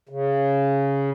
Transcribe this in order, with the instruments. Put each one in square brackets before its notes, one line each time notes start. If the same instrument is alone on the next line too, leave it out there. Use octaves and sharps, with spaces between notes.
[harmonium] C#3